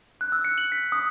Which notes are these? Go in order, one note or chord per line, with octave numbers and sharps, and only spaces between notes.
F#6
E6
C#7
F#7
B6
D#6